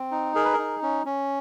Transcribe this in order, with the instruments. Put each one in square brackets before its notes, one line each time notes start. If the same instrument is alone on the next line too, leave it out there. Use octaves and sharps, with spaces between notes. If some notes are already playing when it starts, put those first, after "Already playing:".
Already playing: [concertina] C4
D#4
G#4 A#4
B4
A#4
D#4
C#4
C#4